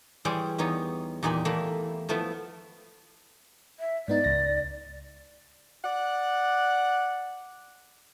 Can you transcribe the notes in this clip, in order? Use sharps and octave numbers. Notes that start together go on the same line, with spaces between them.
E3 G3 G4 G#4 C5 C#5
E2 B3 D#4 C#5
E2 A#2 D#4 G4 G#5 B5
E2 A3 A#3 E4
F3 A3 B3 E4
E5
G#2 B3 D#4 D5
C#2 A#6
D5 F#5